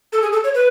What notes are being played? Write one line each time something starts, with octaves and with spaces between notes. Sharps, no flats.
A4
G#4
A4
C#5
B4